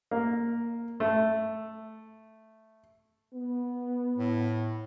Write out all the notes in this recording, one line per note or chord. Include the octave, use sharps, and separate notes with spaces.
A#3
A3
B3
A2